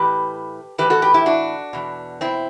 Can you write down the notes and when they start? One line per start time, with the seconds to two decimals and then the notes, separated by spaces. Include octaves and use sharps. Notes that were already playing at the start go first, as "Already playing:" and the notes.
Already playing: A2 E3 G4 B4
0.78 A2 E3 G4 B4
0.90 F#4 A4
1.02 G4 B4
1.14 E4 G4
1.26 D4 F#4
1.73 E2 B2
2.21 C4 E4